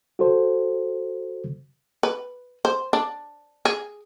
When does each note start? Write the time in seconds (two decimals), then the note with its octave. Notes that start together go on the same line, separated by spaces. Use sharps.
0.19 F#4 A4 C5
2.03 B4
2.65 C5
2.93 D4
3.65 G#4